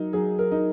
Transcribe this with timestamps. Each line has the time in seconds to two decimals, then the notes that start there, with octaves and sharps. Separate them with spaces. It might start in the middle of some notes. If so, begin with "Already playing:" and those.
Already playing: F#3 D#4 A#4
0.13 F#3 G#4
0.39 A#4
0.51 D#4